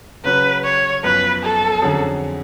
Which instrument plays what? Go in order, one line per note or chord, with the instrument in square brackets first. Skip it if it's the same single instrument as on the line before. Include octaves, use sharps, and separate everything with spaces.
[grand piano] C#3 F#3 C#4 F#4 [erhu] B4
[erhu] C#5
[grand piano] F#2 F3 B3 [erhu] B4
[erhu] A4
[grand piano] F2 D3 F#3 C#4 G#4